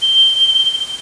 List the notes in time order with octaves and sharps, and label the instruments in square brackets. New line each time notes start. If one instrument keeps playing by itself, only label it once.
[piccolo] G7